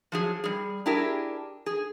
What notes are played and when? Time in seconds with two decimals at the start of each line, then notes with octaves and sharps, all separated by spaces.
0.12 F3 F#3 G#4
0.44 G3 G#4
0.86 D4 E4 G4 G#4 A#4
1.66 G#4